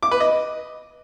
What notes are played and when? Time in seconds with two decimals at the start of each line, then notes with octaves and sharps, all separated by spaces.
0.03 D6
0.11 B4
0.20 D#5